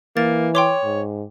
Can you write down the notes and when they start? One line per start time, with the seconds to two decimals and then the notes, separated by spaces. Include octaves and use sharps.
0.17 E3 A#3 A6
0.55 C#5 G5 C6 D6
0.84 G#2